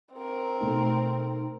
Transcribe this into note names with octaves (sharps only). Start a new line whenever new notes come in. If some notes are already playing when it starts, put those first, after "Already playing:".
C4 A#4
B2 A3 D#4